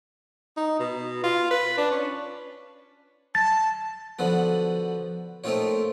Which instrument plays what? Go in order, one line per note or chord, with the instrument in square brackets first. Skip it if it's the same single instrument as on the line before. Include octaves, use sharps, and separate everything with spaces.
[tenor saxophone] D#4
B2
F4
B4
D4
C#4
[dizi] A5 [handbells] A6
[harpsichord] D3 F3 B3 F#4
A3 A#3 C4 D#4 F4 C#5